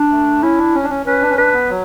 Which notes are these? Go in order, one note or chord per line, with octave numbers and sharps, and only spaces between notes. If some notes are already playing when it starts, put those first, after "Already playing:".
Already playing: D4
A3
C#4 E4
D4
C#4
D4
C#4
C#4 B4
D4
C#4
D4 B4
B3
F#3